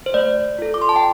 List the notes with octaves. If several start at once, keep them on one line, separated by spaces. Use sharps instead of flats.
C5
A3 D5
F4 A4
D6
C6
A5
G5